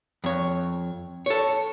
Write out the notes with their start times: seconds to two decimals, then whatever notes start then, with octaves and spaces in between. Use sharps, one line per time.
0.24 F2 C#5
1.26 A4 C#5